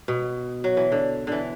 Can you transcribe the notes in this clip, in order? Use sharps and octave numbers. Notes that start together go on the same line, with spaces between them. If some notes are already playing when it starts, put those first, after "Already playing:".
B2
F#3
E3
D3
D3 E3